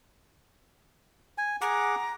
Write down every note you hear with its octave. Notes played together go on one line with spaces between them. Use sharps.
G#5
G#4 F#5 A#5 D6